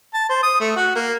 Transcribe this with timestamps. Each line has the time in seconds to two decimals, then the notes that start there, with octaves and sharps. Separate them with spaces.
0.14 A5
0.29 C5
0.43 D#6
0.60 A3
0.76 F#4
0.95 A#3